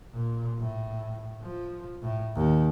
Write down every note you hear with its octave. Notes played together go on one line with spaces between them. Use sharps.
A#2
A2
F3
A2
D#2